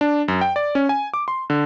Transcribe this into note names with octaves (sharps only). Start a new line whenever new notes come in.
D4
F#2
G5
D5
C#4
G#5
D6
C6
D3